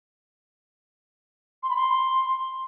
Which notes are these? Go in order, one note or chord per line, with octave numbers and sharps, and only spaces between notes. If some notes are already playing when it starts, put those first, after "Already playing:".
C6
B5
C6